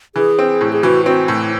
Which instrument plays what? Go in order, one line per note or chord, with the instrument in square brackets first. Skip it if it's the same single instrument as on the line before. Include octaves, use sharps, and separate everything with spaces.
[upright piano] E3 [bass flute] G#4
[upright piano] C4
A2
[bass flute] G#4
[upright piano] E3 [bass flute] F#4
[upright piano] C4 [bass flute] F#4
[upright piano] A2 [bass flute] E4